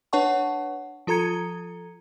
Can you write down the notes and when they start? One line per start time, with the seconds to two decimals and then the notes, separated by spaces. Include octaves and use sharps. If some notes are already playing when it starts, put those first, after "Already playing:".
0.13 D4 B4 C#5 F#5 A5 C#6
1.07 F3 F4 A4 A#5 G#6 C#7